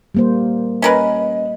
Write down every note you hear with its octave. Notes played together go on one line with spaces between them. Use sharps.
G3 A#3 C5
C#4 A#4 B4 D#5